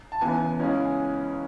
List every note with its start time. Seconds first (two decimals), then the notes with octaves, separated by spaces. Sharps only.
0.12 A5
0.21 E1 E2 C#3 E3 B3 G#5
0.60 C#2 C#3 E3 G#3 C#4